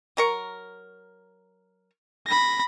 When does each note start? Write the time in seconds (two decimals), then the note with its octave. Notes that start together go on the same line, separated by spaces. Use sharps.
0.17 F#3 A#4 C#6
2.27 B5 A#6